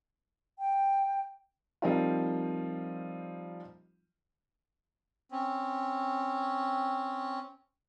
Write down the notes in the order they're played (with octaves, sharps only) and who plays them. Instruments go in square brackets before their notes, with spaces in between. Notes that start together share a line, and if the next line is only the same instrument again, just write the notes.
[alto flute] G5
[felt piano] F3 G3 A#3 C4 D#4 F4
[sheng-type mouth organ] C4 C#4